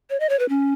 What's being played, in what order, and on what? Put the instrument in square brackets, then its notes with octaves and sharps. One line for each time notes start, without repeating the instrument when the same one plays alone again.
[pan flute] C#5
D#5
C#5
B4
C#4